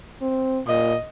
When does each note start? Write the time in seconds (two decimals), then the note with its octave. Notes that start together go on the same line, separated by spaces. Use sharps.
0.22 C4
0.67 A#2 D#5